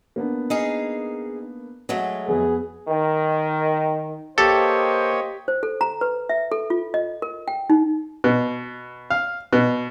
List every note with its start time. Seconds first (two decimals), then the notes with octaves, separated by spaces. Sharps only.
0.16 A#3 B3 D4
0.50 D#4 G#4 F5
1.89 F#3 G#3 A3
2.28 F2 B3 G#4
2.88 D#3
4.38 A#3 G4 A4 C5 C#5 D#5 G5
5.48 C5
5.63 A4
5.81 A#5
6.01 B4
6.29 E5
6.52 A4
6.70 F4
6.94 D#5
7.22 A#4
7.48 G5
7.70 D#4
8.24 B2
9.10 F5
9.53 B2